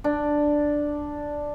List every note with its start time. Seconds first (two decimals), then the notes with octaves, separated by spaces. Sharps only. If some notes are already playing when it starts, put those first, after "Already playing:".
0.04 D4